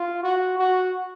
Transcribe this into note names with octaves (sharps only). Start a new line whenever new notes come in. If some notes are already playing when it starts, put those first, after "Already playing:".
Already playing: F4
F#4
F#4